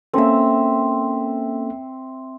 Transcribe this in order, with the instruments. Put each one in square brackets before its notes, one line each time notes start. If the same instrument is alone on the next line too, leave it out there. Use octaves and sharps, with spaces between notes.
[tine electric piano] A#3 C#4 A4 [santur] C4 E5